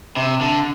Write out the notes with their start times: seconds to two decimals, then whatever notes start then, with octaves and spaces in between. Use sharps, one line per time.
0.16 C3
0.41 D3